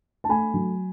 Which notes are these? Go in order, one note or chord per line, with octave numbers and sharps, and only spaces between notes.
A5
A3 G#5 B5
F#3